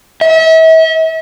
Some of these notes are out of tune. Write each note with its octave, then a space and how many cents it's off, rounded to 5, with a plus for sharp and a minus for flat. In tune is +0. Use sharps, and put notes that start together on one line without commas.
E5 -40